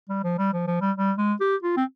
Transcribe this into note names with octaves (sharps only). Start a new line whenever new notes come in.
G3
F3
G3
F3
F3
G3
G3
G#3
G4
F4
C4